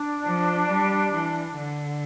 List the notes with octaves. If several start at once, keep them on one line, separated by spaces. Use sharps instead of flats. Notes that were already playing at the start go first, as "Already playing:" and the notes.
Already playing: D4
F3
G3
E3
D3